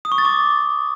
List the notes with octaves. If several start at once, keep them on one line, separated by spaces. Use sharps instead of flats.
D#6
C#6
A6
D6